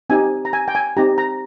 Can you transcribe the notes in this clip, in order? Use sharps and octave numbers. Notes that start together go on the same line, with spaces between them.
C4 D#4 G4 G#5
A#5
G#5
G5
G#5
C4 D#4 G4 A#5
A#5